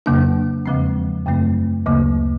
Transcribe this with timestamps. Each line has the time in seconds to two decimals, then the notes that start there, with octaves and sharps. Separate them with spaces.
0.06 F2 C#3 F#3 A#3 D4
0.66 E2 C#3 F3 G#3 C4
1.26 F#2 C#3 F#3 A3 C4
1.86 D2 C#3 F#3 A#3